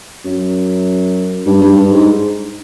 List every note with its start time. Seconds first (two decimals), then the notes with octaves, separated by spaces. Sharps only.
0.25 F#2
1.46 G2
1.62 G2
1.77 G2
1.92 G#2